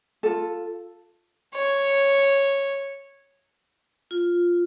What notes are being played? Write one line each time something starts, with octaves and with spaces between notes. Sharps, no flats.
F4 A4
C#5
F4